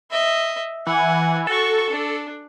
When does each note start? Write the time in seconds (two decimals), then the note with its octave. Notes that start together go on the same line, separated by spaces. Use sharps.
0.10 D#5 E5
0.87 E3 F#5 G#5
1.47 F#4 A4 C#6
1.90 D4